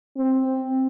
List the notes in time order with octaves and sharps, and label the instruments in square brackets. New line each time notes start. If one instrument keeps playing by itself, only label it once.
[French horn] C4